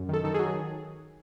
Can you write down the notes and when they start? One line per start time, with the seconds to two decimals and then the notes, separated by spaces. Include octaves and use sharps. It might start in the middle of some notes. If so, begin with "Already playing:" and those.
Already playing: F#2
0.09 D#3 A4
0.24 D#3 A4
0.34 F#3 G#4